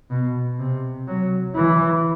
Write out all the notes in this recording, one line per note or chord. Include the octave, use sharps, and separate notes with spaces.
B2
C3
F#3
E3